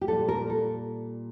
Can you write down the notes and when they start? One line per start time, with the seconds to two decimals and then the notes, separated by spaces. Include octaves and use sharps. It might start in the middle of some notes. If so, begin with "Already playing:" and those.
0.01 G4
0.08 A#2 G3 A4
0.28 A#4
0.50 A4